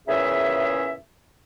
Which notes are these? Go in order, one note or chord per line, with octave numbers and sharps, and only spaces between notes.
E2 A#2 C#3 C#4 G#4 E5